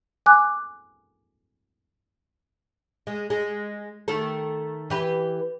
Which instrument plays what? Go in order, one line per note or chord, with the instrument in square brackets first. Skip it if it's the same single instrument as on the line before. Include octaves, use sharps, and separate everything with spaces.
[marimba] G#5 D6 F#6
[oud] G#3
G#3
D#3 A3 A4
E3 G4 B4